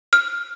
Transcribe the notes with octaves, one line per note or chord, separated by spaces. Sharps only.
F6